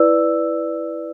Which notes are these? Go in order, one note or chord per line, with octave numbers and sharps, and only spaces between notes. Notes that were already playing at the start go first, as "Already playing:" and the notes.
Already playing: E4 B4 D5 E6